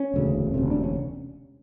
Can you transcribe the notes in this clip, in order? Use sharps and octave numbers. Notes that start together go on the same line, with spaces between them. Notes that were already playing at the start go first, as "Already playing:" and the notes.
Already playing: C#4
E1 D2 C#3
E1 D2 C3
D4
C#4